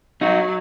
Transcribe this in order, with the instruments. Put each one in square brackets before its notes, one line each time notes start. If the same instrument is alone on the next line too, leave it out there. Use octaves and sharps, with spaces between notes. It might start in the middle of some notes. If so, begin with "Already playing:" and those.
[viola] F#3 [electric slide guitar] D#4 F#4